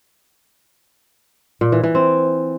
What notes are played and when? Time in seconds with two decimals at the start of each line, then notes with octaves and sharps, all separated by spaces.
1.61 A#2
1.72 E3
1.84 E3
1.95 C4